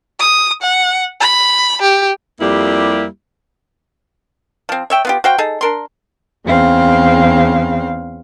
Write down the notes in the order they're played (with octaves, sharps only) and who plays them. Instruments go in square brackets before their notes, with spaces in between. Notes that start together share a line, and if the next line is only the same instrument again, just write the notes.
[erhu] D#6
F#5
B5
G4
[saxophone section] F2 G3 A#3 E4 G4
[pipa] F3 C4
C#5 E5 G5
B3 F4 G4
F#4 C5 F5 G5
D#4 G#4 A4
D4 A#4 C6
[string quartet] E2 C#3 C4 F5